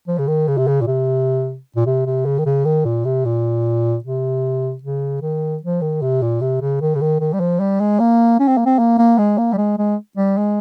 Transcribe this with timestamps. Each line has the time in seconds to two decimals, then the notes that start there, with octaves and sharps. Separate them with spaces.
0.08 F3
0.18 C#3
0.27 D#3
0.48 C#3
0.57 C3
0.67 C#3
0.81 A#2
0.87 C3
1.76 A#2
1.86 C3
2.06 C3
2.25 C#3
2.38 D#3
2.46 C#3
2.65 D#3
2.85 A#2
3.05 C3
3.25 A#2
4.04 C3
4.83 C#3
5.22 D#3
5.63 F3
5.81 D#3
6.02 C3
6.22 A#2
6.41 C3
6.61 C#3
6.81 D#3
6.95 C#3
7.01 D#3
7.20 D#3
7.33 G3
7.40 F3
7.60 G3
7.80 G#3
8.00 A#3
8.39 C#4
8.48 C4
8.57 A#3
8.66 C4
8.79 A#3
8.98 A#3
9.18 G#3
9.38 A#3
9.53 G3
9.57 G#3
9.78 G#3
10.17 G3
10.37 G#3